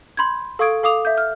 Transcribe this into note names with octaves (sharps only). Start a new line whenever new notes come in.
B5 C6 G6 G#6
A4 F5 C#6 D#6 G#6 D7
A4 F5 D6 D#6 F7
E5 G6
F6